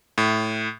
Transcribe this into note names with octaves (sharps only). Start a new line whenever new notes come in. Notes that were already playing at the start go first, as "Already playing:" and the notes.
A2